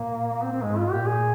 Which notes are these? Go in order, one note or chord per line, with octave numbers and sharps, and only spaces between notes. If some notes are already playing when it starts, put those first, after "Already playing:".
Already playing: A#2 A#3
A#3
C4
C4
G#2 G#3
F4
A#2 G4
G#4